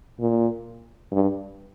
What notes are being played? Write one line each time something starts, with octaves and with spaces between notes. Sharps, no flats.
A#2
G2